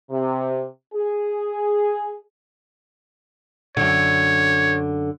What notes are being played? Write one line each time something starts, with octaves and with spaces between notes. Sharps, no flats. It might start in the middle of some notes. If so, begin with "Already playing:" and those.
C3
G#4
F#2 D3 C#5